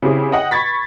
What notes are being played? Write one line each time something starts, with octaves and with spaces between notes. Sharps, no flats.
C#3 C4 E4 G4 G#4
D#5 F#5 G5
B5 C#6 G#6 A6 B6